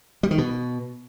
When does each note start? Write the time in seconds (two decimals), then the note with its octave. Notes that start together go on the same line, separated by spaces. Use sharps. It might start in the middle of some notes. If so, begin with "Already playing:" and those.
0.23 G3
0.31 D#3
0.38 B2